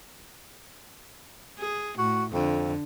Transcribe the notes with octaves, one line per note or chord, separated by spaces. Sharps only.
G#4
A2 F#4
F2 D3